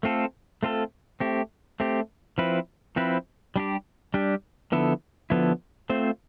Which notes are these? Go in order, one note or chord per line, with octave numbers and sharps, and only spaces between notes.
A3 C4 F4 A4
A3 C4 F4 A4
A3 C4 G4
A3 C4 G4
F3 C4 E4 B4
F3 C4 E4 B4
G3 D4 G4
G3 D4 G4
D3 F3 B3 E4 A4
D3 F3 B3 E4 A4
A3 C4 F4 C5